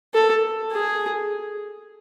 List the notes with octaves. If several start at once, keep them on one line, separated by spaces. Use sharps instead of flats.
A4
G#4